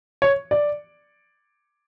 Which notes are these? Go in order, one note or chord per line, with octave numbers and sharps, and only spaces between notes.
C#5
D5